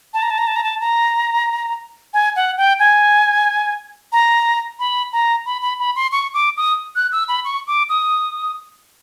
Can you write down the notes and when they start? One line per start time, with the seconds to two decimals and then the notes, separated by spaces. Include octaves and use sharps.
0.14 A5
0.22 A#5
0.30 A5
0.38 A#5
0.47 A5
0.56 A#5
0.64 A5
0.80 A#5
2.14 G#5
2.36 F#5
2.58 G5
2.79 G#5
4.12 A#5
4.79 B5
5.13 A#5
5.46 B5
5.62 B5
5.79 B5
5.96 C6
6.12 C#6
6.34 D6
6.57 D#6
6.96 F#6
7.12 E6
7.28 B5
7.45 C#6
7.67 D6
7.89 D#6